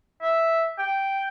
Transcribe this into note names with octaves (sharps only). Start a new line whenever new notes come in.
E5
G5